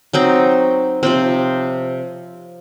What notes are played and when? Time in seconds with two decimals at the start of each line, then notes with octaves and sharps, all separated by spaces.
0.13 F#3 C4 D#4
1.03 C3 F3 C4